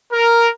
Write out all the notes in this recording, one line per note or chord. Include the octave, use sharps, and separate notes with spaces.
A#4